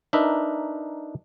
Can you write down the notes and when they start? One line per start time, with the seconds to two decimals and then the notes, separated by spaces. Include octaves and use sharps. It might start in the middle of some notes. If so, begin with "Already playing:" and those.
0.13 D4 D#4 A#4 B4 E5